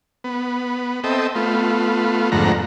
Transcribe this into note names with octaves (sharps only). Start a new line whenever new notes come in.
B3
C4 A4 D#5 E5 G5
A3 B3 F4
F2 G#2 D3 A3 F#5 A#5